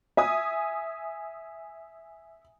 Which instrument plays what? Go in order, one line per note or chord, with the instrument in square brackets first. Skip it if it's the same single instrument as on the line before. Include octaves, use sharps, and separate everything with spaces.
[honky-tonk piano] E5 G#5 D#6